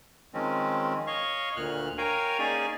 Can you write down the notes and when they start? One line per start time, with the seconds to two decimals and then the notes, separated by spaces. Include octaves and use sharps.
0.34 D#3 F3 G#3 C4 C#4
1.07 C#5 D#5 F5 C#6
1.56 D2 A#2 F6 F#6
1.98 A#4 C#5 F5 G5 G#5 A#5
2.39 A#3 C#4 D#4 G#4 D5 G#5